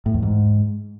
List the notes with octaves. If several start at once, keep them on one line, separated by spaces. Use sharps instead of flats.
A2
E2
G#2